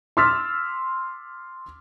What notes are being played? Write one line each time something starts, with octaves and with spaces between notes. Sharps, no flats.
C6 D6 E6 F6 A6 B6